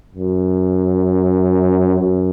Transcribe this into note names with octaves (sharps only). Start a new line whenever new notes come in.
F#2
F#2